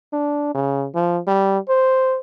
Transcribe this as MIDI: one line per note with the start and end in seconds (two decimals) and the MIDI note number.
0.13 0.54 62
0.54 0.86 49
0.94 1.19 53
1.27 1.58 55
1.69 2.19 72